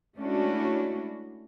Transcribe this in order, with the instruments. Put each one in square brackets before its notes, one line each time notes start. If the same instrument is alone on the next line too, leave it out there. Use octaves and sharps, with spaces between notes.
[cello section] G#3 A3 C#4 D4 E4 F#4